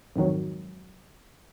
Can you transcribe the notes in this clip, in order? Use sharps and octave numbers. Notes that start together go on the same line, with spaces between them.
F2 G#2 D#3 F#3